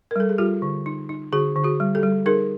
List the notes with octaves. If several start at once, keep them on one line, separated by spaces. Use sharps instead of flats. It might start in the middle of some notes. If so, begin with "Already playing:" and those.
A#4
G3 A4
G#4
G3 F4 G4
D3
D#4
D#4
D3 F#4 G#4
D3
F#4 G#4
G3
G4 A4
G3
D#4 G#4 A#4